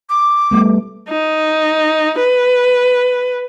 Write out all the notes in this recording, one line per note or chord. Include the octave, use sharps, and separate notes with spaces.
D6
G3 A3 B3
D#4
B4